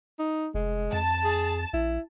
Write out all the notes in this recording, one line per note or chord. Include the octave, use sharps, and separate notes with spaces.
D#4
F1 G#3
F2 A5
G#4
A#1 E4